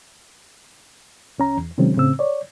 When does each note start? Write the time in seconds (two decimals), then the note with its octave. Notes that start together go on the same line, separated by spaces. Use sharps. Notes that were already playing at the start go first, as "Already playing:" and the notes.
1.38 C2 C#4 A#5
1.57 E2
1.78 C3 D#3 F#3 G#3 C4 C#4
1.96 A2 C#3 C4 E6
2.19 C#5 D5